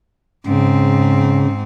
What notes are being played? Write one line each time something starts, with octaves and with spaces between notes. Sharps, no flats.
G#2 C#3 C4